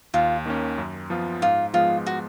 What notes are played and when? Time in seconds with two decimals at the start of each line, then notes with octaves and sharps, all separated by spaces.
0.14 D#2 F4
0.46 D#3 A#3 C#4
0.78 F#2
1.10 F3 B3 F4
1.42 G#2 F4
1.73 F3 G#3 B3 F4
2.06 F#4